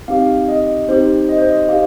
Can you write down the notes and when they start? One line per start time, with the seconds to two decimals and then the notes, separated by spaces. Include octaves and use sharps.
0.08 C4 D#4 G4 F5
0.48 D#5
0.88 C4 D#4 G4 C5
1.29 D#5
1.38 C5
1.47 D#5
1.69 D#4 G4 F5